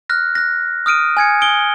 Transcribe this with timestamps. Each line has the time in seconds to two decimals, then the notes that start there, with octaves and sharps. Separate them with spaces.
0.09 F6 F#6 A#6
0.35 F#6 A#6
0.86 D#6 F6 D7 D#7
1.17 G#5 G#6 C#7
1.41 D#6 D7 G7